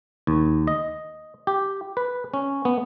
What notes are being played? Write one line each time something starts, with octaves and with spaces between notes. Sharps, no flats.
D#2
D#5
G4
B4
C#4
B3